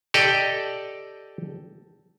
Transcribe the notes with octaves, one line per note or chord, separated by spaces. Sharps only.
G4 A4 D5 D#5 G5